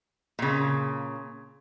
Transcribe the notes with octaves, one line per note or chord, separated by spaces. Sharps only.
A#2 C#3